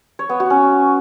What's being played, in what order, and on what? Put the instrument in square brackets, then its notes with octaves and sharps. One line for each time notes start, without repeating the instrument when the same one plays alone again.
[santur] C#5
B3
F#4
C#4